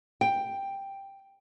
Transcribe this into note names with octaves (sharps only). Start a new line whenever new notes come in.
G5